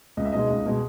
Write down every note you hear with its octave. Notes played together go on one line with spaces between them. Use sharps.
C#2 D#5
E5
B2 G#3 D#4 D#5
C#2
B2 G#3